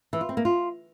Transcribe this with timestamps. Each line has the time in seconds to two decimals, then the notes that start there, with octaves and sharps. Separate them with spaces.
0.13 E3
0.21 F4
0.29 C4
0.37 A#3
0.45 F4